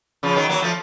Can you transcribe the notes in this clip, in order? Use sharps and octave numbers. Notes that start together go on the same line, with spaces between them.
C#3 F3
D#3 F#3
F#3 A#3
F3 A3